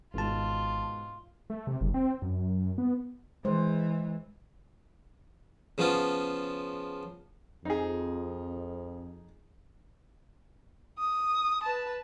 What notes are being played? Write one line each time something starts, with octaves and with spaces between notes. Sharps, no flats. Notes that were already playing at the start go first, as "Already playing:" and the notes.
G#1 G#2 B2 F4 A5
A3
C3
F#1
C4
F#2
B3
E3 G#3 C5
C#3 F3 B3 C#4 F4
F2 D#4 G#4
D#6
B4 A5